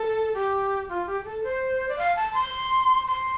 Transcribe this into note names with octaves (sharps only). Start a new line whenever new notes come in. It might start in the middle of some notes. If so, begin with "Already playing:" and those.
Already playing: A4
G4
F4
G4
G4
A4
C5
D5
F5
A5
C6
C6